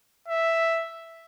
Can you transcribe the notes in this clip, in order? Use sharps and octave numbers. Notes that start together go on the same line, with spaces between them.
E5